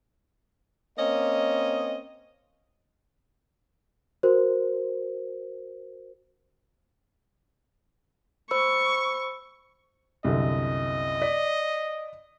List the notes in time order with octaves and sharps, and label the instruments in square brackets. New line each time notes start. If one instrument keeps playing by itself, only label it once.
[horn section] A#3 C4 C#4 D#5
[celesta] F#4 A#4 C5
[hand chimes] C5 B5 E6 [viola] C#6
[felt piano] C2 F#2 D3 [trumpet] D#5
[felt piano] D5 B6